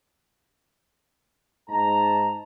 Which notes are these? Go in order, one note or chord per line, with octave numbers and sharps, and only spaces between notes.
G#2 D#5 A5 A#5